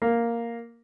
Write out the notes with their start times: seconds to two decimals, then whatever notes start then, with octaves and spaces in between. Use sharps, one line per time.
0.02 A#3